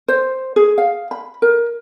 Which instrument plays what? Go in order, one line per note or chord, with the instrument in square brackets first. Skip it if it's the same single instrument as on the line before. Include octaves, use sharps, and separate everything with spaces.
[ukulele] C5
G#4
F5
B5
A#4